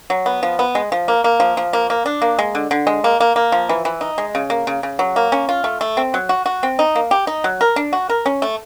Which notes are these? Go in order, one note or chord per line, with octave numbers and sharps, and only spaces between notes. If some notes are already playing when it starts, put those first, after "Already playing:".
F#3
B3
F3
B3
G#3
F3
A#3
A#3
F3
F3
A#3
A#3
D4
A#3
G#3
D3
D3
G#3
A#3
A#3
A#3
F3
E3
E3
D#4
G#3
C#3
A#3
C#3
C#3
F#3
A#3
C#4
F4
A3
A3
C4
F#3
F#4
F#4
C4
D#4
A#3
G4
D#4
F#3
A#4
D4
F#4
A#4
C#4
A3